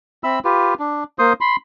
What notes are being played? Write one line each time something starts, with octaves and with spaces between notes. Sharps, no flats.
C4 E5 B5 E6
F4 G4 B4
D4
A#3 C5 C6 D#6
B5 C6